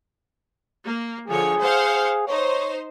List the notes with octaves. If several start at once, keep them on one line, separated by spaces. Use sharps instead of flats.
A#3
D3 F3 G#4 C#5
C5 F5 F#5
D#4 C5 C#5